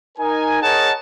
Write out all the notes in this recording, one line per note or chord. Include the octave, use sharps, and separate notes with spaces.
D#4 A#4 G#5
G#4 A#4 C#5 D#5 F#5 A5